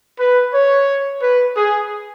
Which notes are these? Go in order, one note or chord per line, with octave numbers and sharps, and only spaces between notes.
B4
C#5
B4
G#4